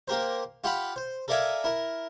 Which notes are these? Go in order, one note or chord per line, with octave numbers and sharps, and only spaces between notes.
A#3 G4 A#4 C5
F4 G4 F5 F#5 B5
C5
A4 A#4 D5 E5 F5 G#5
E4 A#4